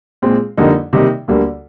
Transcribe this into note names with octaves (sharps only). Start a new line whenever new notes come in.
A#2 G#3 C4
F2 D3 G3 A#3 D#4
C3 D#3 G3 A#3 D#4
D2 D3 G3 A#3